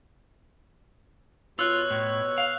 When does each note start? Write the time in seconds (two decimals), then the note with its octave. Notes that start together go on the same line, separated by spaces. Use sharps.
1.59 B2 F4 C#5 E6 F#6
1.91 A2
2.38 F5